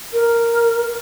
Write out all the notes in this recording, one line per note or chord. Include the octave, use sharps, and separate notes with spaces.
A#4